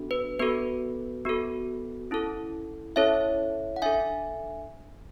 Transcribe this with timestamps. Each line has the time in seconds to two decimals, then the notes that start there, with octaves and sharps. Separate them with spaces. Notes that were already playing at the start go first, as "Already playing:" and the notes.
Already playing: B3 D4 F#4 A4
0.11 B4
0.39 B3 F#4 A4 B4
1.25 B3 F#4 A4
2.11 C#4 E4 A4
2.96 C#4 E4 A4 C#5 E5
3.76 F#5
3.82 D4 A4 E5 G#5